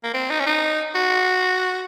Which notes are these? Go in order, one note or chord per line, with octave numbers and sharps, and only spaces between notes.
A#3
C4
D#4
C#4
D#4
F#4